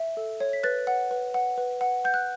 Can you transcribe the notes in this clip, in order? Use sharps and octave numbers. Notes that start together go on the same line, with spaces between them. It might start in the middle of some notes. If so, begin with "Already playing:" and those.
Already playing: E5
A4
C#5
B6
B4 F#6 A6
F#5
B4
F#5
B4
F#5
F#5 G6
F#6